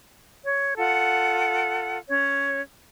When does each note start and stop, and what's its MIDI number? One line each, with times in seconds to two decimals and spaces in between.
0.45 0.74 73
0.77 1.97 65
0.77 1.97 69
0.77 1.97 78
2.09 2.62 61
2.09 2.62 73